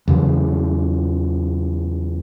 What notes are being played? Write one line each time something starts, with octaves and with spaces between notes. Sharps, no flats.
E2 C#3 E3 F#3